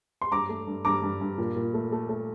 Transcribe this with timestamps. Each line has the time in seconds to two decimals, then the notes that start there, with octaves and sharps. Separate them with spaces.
0.22 C6
0.32 G2 A#5 D6
0.49 A3
0.67 G2
0.85 G2 A#5 D6
1.03 G2
1.21 G2
1.38 A#2
1.56 A#2
1.74 A3
1.92 A3
2.09 A3